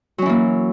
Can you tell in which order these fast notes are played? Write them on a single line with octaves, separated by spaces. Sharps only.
F#3 C#4 E3 A#3